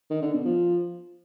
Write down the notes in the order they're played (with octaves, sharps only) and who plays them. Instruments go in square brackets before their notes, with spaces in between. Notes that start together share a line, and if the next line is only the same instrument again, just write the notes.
[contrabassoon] D#3
D3
B2
F3